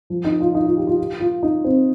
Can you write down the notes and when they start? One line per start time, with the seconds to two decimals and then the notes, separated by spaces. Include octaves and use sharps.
0.10 F3
0.25 D#4
0.41 F4
0.55 D#4
0.66 F4
0.77 G4
0.87 F4
1.20 F4
1.43 D#4
1.64 C4